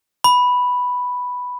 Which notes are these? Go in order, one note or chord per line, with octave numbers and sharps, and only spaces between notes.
B5